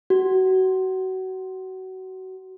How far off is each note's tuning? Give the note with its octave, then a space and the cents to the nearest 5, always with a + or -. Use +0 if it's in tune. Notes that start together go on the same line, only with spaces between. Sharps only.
F#4 +25